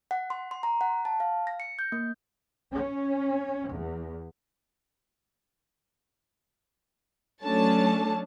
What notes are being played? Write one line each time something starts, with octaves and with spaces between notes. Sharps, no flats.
F#5
C6
C6
A#5
F#5
A5
F5
A#6
C#7
G6
A#3
C#4
E2
F#3 A3 C#4 D4 C#5 A5